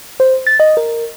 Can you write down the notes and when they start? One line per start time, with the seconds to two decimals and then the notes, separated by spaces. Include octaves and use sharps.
0.20 C5
0.47 A6
0.60 D#5
0.77 A#4